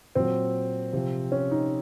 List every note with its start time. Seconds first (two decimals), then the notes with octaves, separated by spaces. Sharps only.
0.15 A#2 F#3 C4
0.93 C3 F3
1.32 C#4
1.51 D#4